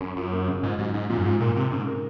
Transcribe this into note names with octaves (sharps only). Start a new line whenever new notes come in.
F#2 C#4
F#2 F4
A#3
C#3
G#2 F4
G#2 F#3
G#2 D#4
A#2 F3
F#2
G#2 F4
A#2 A#4
C3 C4
G#2 C#3
A#4